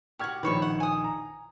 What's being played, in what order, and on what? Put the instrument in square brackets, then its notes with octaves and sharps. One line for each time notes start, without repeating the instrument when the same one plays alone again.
[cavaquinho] F#4 G4 [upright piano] C#6 F6 G#6
[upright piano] A#1 D#3 [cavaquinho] B4 C#5 C#6
[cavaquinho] F#5
G#5 D#6
[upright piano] A#5